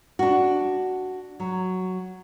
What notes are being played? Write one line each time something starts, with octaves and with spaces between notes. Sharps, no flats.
D4 F#4
F#3